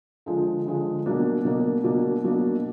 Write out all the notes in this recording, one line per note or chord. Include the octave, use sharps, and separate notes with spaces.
D3 F3 G#3
D3 F3 G#3
B2 F#3 A#3 D4
B2 F#3 A#3 D4
B2 F#3 A#3 D4
B2 F#3 A#3 D4